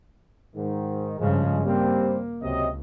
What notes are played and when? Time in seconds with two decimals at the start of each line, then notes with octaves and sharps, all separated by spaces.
0.56 G#2 D#3
1.19 G2 C#3 F3 G#3
1.65 G3 A#3 C4
2.42 C#2 C3 F#3 D#5